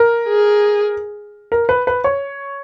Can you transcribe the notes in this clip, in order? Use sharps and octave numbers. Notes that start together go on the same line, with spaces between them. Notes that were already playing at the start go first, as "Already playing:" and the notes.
Already playing: A#4
G#4
A#4
B4
B4
C#5